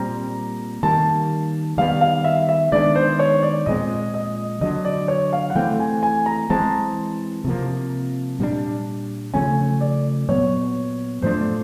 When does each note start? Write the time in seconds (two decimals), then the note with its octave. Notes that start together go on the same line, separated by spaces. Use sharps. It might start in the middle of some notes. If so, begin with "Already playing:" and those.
Already playing: A#2 G3 C4 A#5
0.83 D#3 G3 A#3 A5
1.78 D#3 G3 B3 F5
2.01 F5
2.24 E5
2.49 E5
2.72 D#3 G#3 B3 D4 D5
2.95 C5
3.19 C#5
3.43 D5
3.66 A#2 F3 G#3 C4 D#5
4.14 D#5
4.61 D3 F#3 A3 D4 D#5
4.85 D5
5.08 C#5
5.33 F5
5.50 F#5
5.55 E3 A3 C4 G5
5.80 G#5
6.03 G#5
6.26 A#5
6.50 E3 G#3 C4 A5
7.45 C3 F3 A#3
8.39 A#2 G3 A#3 D4
9.34 C#3 F3 A3 C#4 G#5
9.81 D5
10.29 A#2 F#3 B3 C#5
11.22 A2 F3 A3 D4 C5